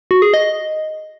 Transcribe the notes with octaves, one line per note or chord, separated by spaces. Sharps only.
F#4
G#4
D#5